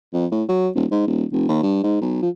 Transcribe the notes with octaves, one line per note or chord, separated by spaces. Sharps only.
F2
A2
F#3
D#1
G#2
D#1
F1
D#2
G2
G#2
B1
F3